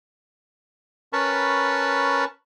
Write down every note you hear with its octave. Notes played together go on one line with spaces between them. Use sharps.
C#4 A#4 B4 A5 B5 C#6